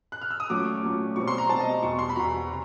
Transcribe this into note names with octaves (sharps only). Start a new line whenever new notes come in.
F#6
F6
E6
D#6
A#2 F#3 A3 C#4 D6
A#2 F#3 A3 C#4
B2 G3 C4 C#6
C6
A#5
B2 G3 C4 A5
D#5
E2 B2 G3 C#6
C6
B5
E2 B2 G3 A#5
C3